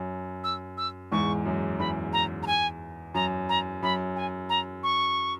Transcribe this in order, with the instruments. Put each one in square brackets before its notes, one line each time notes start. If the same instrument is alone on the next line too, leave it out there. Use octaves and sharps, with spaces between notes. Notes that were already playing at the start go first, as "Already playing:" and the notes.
Already playing: [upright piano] F#2
[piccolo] E6
E6
[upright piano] E2 G#2 [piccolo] C#6
[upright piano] F#2
[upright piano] E2 [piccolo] B5
[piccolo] A#5
A#5
G#5
[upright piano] F#2 [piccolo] A#5
[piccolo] A#5
[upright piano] F#2 [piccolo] B5
[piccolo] G#5
A#5
C#6